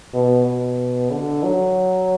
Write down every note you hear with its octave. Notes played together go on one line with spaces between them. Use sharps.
B2
B2
D3
F#3